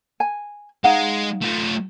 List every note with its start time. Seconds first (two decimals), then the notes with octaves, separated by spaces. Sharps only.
0.20 G#5
0.84 G#3 D#4 F5 F#5
1.42 A3 F4